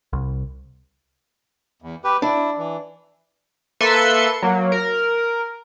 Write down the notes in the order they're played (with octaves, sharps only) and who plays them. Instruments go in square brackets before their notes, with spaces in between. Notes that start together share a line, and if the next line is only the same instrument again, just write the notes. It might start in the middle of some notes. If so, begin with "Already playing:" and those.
[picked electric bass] C2
[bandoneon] E2
G4 B4
[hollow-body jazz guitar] D4 [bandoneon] E4
[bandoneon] E3
[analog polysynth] A#3 A4 B4 E5 C6 C#7
F#3 A#3
A#4